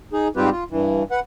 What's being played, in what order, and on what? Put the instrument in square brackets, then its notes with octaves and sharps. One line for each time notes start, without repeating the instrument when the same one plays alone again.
[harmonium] D#4 G#4
G#2 G3 C4 F4 G4 B4
F4
G2 E3
B4 F#5